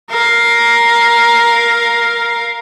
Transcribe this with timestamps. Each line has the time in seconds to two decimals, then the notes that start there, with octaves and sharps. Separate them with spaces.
0.10 A#4 F5